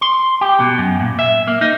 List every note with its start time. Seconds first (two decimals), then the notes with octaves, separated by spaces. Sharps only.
0.01 C6
0.41 G4
0.60 B2
0.78 F#2
1.00 A#2
1.19 E5
1.47 A#3
1.61 D#4